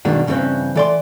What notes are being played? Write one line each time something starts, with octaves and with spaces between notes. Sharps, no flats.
G2 B2 D#3 G#3 D4
G2 C#3 E3 G3 C4 C#4
E3 A4 D5 A#5 C6